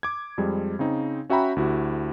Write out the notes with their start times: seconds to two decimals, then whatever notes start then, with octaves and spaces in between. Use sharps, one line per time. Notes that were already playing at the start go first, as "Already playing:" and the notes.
0.03 D6 G#6
0.38 F2 G3 G#3
0.79 C#3 C4 D#4
1.30 C#4 F#4 E5 G5 A#5 B5
1.56 D2 E4 F#4 G4